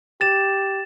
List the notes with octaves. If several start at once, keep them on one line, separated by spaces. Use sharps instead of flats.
G4 A6 E7